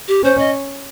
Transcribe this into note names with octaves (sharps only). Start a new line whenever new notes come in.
G4
C#4 C5
D#5